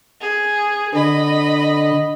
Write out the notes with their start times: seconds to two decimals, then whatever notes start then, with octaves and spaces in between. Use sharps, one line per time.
0.21 G#4
0.95 D3 D#5 B5